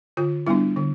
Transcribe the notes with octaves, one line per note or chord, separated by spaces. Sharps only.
D3 F4
G3 B3 D4 E4
D3